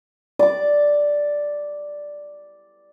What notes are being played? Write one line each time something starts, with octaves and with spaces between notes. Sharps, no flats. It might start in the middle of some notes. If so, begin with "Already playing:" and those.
D5 D6